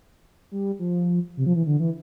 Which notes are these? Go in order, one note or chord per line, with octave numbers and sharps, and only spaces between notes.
G3
F3
C3
F3
E3
D3
E3